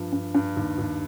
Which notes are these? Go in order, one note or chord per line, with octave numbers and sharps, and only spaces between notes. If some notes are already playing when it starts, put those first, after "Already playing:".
Already playing: G2 F3
G2
G2
D#2
D#2